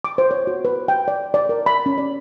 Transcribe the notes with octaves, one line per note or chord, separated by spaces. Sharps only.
D6
C5
C#5
F#4
B4
G5
D5
D5
A#4
B5
C#4
D5